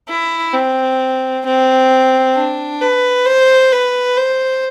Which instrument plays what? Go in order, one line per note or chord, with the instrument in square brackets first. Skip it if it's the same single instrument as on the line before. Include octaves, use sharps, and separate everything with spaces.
[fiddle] E4
C4
C4
D4
B4
C5
B4
C5